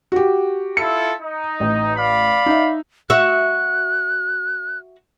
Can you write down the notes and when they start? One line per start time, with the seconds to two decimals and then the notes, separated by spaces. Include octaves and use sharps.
0.12 F#4 G4
0.77 E4 F4 A4 C#7
1.20 D#4
1.60 A1
1.97 D5 F5 B5
2.46 D#4 E5
3.10 F#4 E5 F#6